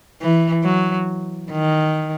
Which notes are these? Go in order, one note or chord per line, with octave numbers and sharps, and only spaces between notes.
E3
F#3
D#3